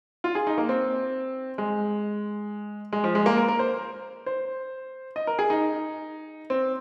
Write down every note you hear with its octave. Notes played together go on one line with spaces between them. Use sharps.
F4
G#4
D#4
A#3
C4
G#3
G#3
F3
G#3
A#3
A#4
A#4
C5
C5
D#5
A#4
G#4
D#4
C4